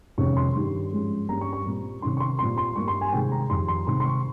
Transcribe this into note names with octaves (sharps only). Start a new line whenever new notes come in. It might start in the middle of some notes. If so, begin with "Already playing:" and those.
F2 C3 D#3 G#3 C#4 C#6
C6
G2 D#3 G3
G#2 F3 G#3 C#4
G2 G3 A#3 C#4 A#5
C#6
C#6
A#2 G3 C4
C3 D#3 G3 C#4 C6
C#6
C6
A#2 G3 C4 C6
C6
G2 G3 A#3 C#6
C6
G#5
C3 D#3 G#3 C4 G5
A#5
F2 D#3 G3 C6
C6
C3 D#3 G#3 C4 C6
C6
C#6